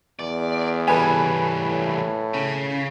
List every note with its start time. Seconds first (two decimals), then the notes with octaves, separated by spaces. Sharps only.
0.19 E2 D5
0.88 E3 G3 A4 B4 G#5
1.58 A2
2.34 C#3